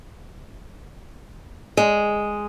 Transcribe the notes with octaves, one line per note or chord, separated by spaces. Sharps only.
G#3